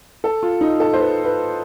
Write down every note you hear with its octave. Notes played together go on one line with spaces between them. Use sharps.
A4
F4
D#4
A4
C5
B4
B4